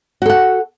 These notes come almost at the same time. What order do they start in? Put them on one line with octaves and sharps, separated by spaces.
F#4 A4 F#5